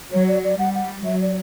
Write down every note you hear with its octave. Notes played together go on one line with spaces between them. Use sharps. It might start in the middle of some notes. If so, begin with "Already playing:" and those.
F#3 C#5
D5
D5
G3 F#5
F#5
F#3 E5
D5